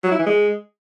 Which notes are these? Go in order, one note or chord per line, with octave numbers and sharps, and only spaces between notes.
F#3
E4
E3
G#3